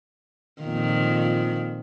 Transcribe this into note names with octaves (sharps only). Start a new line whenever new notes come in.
F2 A#2 D#3